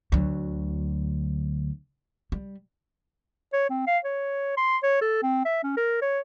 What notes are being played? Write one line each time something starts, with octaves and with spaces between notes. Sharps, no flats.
D2 F#3
G3
C#5
C4
F5
C#5
C6
C#5
A4
C4
E5
C#4
A#4
C#5